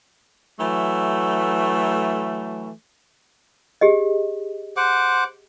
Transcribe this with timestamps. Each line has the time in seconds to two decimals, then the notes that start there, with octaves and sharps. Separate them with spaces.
0.60 E3 F#3 A3
3.81 G4 G#4 D#5
4.77 C5 F#5 D6